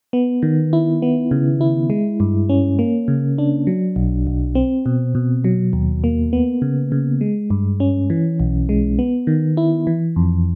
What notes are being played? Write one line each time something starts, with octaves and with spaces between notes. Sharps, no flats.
B3
D#3
E4
B3
C#3
E4
G#3
G2
C#4
A#3
C#3
D4
F#3
B1
B1
C4
B2
B2
F#3
D#2
A#3
B3
C#3
C#3
G#3
G2
C#4
E3
B1
G#3
B3
D#3
E4
E3
F2